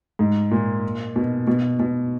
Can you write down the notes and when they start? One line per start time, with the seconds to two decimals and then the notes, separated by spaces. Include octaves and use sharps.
0.19 G#2
0.51 A#2
1.16 B2
1.47 B2
1.80 B2